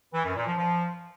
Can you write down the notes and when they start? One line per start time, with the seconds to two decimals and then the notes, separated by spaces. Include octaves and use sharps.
0.14 E3
0.25 F#2
0.36 A#2
0.47 F3
0.58 F3